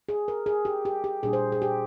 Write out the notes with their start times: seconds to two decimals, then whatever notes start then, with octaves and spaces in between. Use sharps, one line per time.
0.09 G#4
0.28 A#4
0.46 G#4
0.65 G4
0.85 G4
1.04 G4
1.23 A#2 G3 D4 G#4
1.33 C5
1.52 G#4
1.62 G4